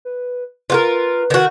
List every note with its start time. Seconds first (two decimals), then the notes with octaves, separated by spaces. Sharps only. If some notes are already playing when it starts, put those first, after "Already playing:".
0.05 B4
0.70 F4 F#4 A#4 B4
1.30 D#3 F#4